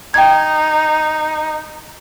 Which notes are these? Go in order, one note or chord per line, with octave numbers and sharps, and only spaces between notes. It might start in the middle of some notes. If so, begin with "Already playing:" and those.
D#4 G5 G#6